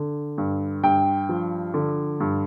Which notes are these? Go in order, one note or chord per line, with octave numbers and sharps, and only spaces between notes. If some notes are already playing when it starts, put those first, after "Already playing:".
Already playing: D3
G2
G2 G5
F3
D3
G2